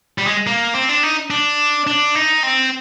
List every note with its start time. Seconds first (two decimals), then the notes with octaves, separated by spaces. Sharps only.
0.18 G3
0.27 G#3
0.47 A#3
0.74 C4
0.89 D4
1.03 D#4
1.31 D4
1.87 D4
2.15 D#4
2.43 C4